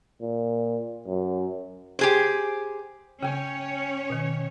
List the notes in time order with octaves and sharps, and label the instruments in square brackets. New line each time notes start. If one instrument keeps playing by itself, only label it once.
[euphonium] A#2
F#2
[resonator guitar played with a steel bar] G4 G#4 C5
[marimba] C#3 [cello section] C#4 C#5 [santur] G5 G#5
[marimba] B2 D#3